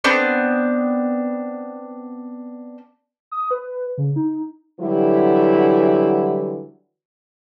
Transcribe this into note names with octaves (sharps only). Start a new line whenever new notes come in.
B3 C4 D4
D#6
B4
C#3
D#4
D3 E3 F#3 G3 E4 F#4